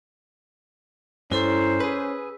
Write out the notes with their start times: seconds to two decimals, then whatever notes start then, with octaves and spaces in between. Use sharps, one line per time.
1.32 G2 C#4 E4 A4 C5 A#5
1.80 G#4 B4 E6